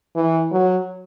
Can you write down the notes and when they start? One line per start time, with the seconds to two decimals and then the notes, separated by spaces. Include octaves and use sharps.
0.16 E3
0.51 F#3